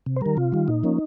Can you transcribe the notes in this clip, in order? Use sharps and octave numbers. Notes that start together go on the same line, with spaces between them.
C3
C5
D#3 G3 A#4
C3 F4
D#3 G3
A#2 D#4
F3 A#3 C#4